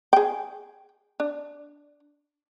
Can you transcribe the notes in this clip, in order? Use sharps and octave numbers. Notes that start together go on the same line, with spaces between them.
G#4 G5
D4